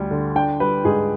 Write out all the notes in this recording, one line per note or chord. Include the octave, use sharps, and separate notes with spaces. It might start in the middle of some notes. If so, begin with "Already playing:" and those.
Already playing: D2 G3
D3
D4 G5
G3 B4
G#2 G#4